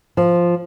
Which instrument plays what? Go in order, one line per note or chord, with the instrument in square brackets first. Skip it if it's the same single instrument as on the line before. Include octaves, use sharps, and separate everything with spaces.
[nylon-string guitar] F3